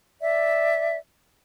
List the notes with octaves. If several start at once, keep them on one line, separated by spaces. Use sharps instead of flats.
D5 E5